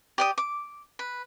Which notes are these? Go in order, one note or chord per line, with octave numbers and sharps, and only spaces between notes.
G4 D5 D#6
D6
B4